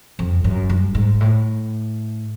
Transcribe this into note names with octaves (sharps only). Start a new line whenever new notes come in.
F2
F#2
G2
G#2
A2